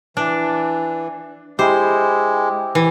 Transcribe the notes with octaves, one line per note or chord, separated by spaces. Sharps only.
E3 D4
G#3 E4 G4 C5
E3